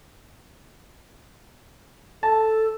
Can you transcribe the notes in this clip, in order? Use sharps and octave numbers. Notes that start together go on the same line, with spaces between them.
A4 A5